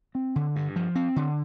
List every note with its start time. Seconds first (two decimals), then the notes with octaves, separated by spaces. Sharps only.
0.15 C4
0.36 D3
0.56 G2
0.76 F3
0.95 C4
1.16 D3